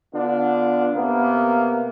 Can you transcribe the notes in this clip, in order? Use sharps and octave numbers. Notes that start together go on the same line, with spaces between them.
D3 B3 D4 F4
C3 A#3 B3